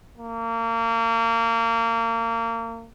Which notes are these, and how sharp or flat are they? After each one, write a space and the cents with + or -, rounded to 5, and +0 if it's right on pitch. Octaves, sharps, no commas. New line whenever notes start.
A#3 -30